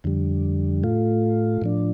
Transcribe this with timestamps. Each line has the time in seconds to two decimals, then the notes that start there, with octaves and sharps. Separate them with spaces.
0.04 F2 D3 G3
0.83 A2 A3 F4
1.62 A2 F3 D4